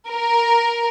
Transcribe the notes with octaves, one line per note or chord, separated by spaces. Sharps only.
A#4